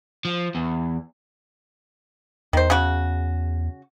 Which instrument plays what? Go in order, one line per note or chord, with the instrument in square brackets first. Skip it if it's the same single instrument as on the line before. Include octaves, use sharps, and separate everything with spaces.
[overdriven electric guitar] F3
E2
[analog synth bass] E2 [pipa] D#3 C5
[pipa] C#3 F#4